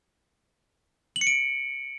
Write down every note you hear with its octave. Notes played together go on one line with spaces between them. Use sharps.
F#7
C#7
D7